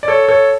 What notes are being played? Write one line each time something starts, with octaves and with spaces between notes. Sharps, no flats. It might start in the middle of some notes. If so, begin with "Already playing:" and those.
D5
A4 C#5
A4 C#5